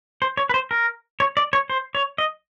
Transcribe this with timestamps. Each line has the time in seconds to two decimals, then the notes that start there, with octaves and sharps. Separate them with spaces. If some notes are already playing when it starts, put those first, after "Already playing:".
0.22 C5
0.37 C#5
0.49 B4
0.54 C5
0.71 A#4
1.20 C#5
1.37 D5
1.53 C#5
1.70 C5
1.95 C#5
2.18 D#5